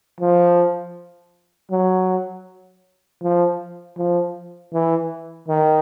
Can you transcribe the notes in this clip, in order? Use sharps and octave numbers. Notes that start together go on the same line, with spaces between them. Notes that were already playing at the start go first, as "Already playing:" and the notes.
F3
F#3
F3
F3
E3
D#3